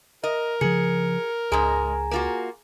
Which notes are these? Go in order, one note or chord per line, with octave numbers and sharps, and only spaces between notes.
A#4 D#5
C#3 F3 G#4 C#7
C#2 G#2 G#3 G#4 G#5 A#5
A#3 F4 F#4